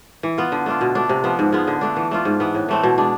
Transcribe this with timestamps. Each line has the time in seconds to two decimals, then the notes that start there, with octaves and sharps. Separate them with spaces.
0.23 E3
0.38 B3 F4
0.52 D3
0.66 A3 D4 F4
0.81 B2
0.95 A3 D4
1.09 C3
1.24 F3 B3
1.39 G#2
1.52 G#3 B3 F4
1.67 D3
1.81 A3 D4
1.97 E3
2.11 A3 D4 F4
2.25 G#2
2.40 E3 B3
2.54 A2
2.69 E3 A3 C4
2.83 B2
2.98 G#3 D4